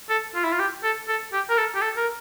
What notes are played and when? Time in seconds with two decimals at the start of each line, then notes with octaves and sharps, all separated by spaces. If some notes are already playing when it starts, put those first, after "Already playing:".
0.10 A4
0.35 F4
0.44 E4
0.52 F4
0.59 G4
0.83 A4
1.08 A4
1.33 G4
1.50 A#4
1.57 A4
1.75 G4
1.82 A4
1.97 A#4